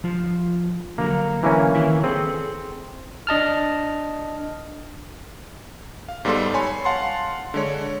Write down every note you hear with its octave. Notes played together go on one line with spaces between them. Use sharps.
F3 F4
D3 F#3 A#3 A#5
E3 A#3 C#4
D#3 E4 E5
C4 G#4 A4
D4 D#5 A5 F6
F5
G#2 G3 B3 A4 C6
C#5 G#5 B5 C6
F5 F#5 A5 C6
D3 G#3 C#5